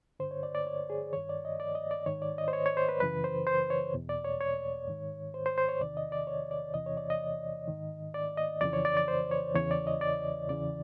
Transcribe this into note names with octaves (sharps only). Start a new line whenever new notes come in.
G2 D3 C5
C#5
D5
D5
C#5
G#4
G2 D#3 C#5
D5
D#5
D5
D#5
D5
G#2 D#3 C#5
D5
D#5
C5
C#5
C#5
C5
B4
F#2 C#3 E3 B4
C5
C5
C#5
E2 B2
D5
C#5
C#5
G#2 D#3
C5
C5
C5
C#5
E2 C3 D#3 D5
D#5
D5
C#5
D5
E2 C3 E3 D#5
C#5
D5
D#5
G#2 D#3
D5
D#5
F2 C#3 E3 D5
C#5
D5
D5
C5
C#5
E2 C#3 E3 C#5
D5
D#5
D5
E2 C#3 E3 D5